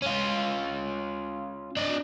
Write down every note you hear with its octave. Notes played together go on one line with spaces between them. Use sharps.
C#4 F4
D4 D#5